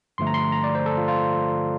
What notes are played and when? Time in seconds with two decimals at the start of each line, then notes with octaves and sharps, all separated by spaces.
0.18 G2 D3 F3 A3 C6
0.27 A#5
0.34 C6
0.52 A#5
0.64 D5
0.75 C5
0.86 A4
0.97 F4
1.08 F4